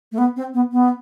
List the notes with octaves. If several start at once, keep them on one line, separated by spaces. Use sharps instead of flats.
A3
B3
C4
B3
B3